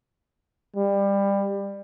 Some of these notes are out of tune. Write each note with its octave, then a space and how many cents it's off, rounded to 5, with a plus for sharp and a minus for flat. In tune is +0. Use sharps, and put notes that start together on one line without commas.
G3 +20